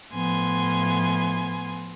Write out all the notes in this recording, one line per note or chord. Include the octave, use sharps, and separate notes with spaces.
A2 F3 B3 G#5 C6